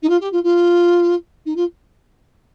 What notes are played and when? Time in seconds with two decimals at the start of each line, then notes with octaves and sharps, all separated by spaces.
0.02 D#4
0.09 F4
0.20 G4
0.32 F4
0.43 F4
1.45 D#4
1.56 F4